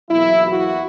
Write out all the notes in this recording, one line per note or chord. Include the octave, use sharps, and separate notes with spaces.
E2 B2 F#3 A#3 E4
F#4